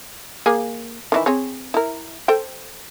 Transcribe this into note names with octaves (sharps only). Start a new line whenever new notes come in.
A#3 G#4 G#5
D#3 E3 E4
C4 G#4 C#5
E4 A#4
A4 C5 G5